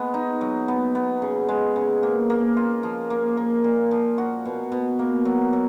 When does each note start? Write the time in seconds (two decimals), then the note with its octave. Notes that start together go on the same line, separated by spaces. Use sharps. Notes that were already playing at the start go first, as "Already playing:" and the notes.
Already playing: G#3 B3
0.14 D#4
0.41 F#3
0.68 B3
0.95 B3
1.22 C#3
1.49 G#3
1.76 C#3
2.03 A#3
2.30 A#3
2.57 F4
2.83 F3
3.10 A#3
3.37 A#3
3.64 A#2
3.91 F3
4.18 F#4
4.45 B2
4.72 B2
4.99 A#3
5.25 F#3
5.53 F#3